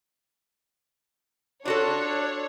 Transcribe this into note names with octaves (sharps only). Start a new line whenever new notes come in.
D4 F4 F#4 A4 C#5